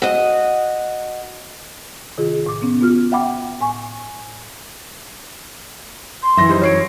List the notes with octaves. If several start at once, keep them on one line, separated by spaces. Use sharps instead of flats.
F#4 D#5
C3 D#3 F4 G#4
A2 D6
B3 C#4
B3 F4 F#4 F6
E5 F#5 G5 B5 D6
A2 G#5 C#6
C6
F#2 E3 E5 A#6
G3 D#4 C5
F#3 C#5 C7 D7